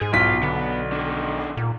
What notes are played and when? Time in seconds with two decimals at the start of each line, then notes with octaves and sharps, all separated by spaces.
0.01 G#2 G#4
0.13 B1 F4 B6
0.43 D3 B3
0.92 D#3 D4
1.57 A#2